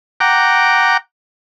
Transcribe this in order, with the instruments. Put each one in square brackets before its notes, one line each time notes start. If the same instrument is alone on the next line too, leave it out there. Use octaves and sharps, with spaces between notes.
[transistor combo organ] F#5 G5 A#5 D6